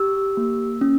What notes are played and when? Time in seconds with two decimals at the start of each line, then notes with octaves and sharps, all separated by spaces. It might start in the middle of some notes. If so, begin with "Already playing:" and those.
Already playing: G4 E6
0.37 A#3
0.81 C#4